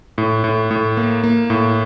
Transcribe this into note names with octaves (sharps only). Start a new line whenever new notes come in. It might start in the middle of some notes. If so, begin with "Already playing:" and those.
A2
A2
A2
A#3
A#3
A2